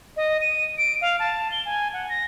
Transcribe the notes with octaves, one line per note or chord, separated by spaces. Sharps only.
D#5
D#7
D7
F5
A5
G7
G#5
F#5
A#6